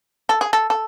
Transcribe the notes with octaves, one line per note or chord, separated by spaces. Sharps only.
A4
G#4
A4
A4